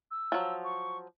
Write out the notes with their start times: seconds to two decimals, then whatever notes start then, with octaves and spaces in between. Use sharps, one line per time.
0.11 E6
0.32 F3 F#3
0.64 C#6